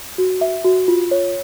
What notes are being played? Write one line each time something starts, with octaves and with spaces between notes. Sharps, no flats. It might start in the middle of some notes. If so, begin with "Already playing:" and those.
F#4
E5
F#4
F4
C#5